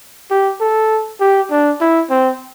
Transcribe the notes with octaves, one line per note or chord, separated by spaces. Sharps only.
G4
A4
G4
D4
E4
C4